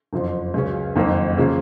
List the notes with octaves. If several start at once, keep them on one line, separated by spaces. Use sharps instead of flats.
F#1 F2 F3
C#2 C#3 F#3 C#4
F#1 F2 D#3 A#3 D#4
C#3 F3 A#3 C#4